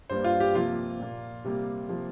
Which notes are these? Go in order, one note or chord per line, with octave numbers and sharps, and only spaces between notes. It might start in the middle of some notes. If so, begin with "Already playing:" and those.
G2 G3 A#3 C5
F4
G4
C3 F3 A#3 F4
A#2 A#3
C3 G3 A#3
C3 F3 A#3